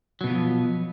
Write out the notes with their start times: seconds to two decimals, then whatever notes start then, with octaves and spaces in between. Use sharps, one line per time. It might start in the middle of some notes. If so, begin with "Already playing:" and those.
0.21 F#3
0.24 B2
0.27 B3
0.30 F3